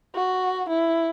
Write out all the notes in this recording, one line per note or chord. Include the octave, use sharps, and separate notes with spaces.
F#4
E4